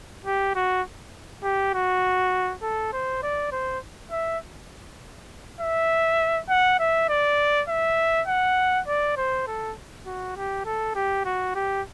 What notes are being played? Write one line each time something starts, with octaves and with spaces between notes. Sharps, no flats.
G4
F#4
G4
F#4
A4
C5
D5
C5
E5
E5
F#5
E5
D5
E5
F#5
D5
C5
A4
F#4
G4
A4
G4
F#4
G4